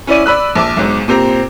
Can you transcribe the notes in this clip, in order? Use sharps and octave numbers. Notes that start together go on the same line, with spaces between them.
C#4 E4 D5 D#7
D5 B5 E6 F#6
A#1 A5 D6
B1 G#2
A#2 C4 G4 A#5